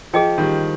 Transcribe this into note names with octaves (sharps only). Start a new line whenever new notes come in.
F3 G#4 D#5 G5
D#3 G3